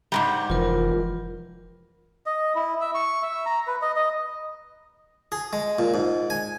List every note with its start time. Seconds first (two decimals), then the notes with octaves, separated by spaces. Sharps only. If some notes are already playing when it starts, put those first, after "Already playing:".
0.12 G#2 C3 G3
0.50 F1 E3 F3 F4 A#4
2.26 D#5
2.55 E4
2.81 E5
2.95 C#6
3.22 E5
3.46 A#5
3.67 B4
3.82 D#5
3.96 D#5
5.32 G#4
5.53 G#3
5.79 A#2
5.94 G#2
6.30 G#5